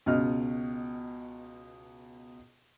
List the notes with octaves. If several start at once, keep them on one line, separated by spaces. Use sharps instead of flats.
C#2 B2 D#5 F6